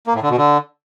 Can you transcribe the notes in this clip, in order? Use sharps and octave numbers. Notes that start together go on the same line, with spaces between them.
A#3
A2
D3
B2
D3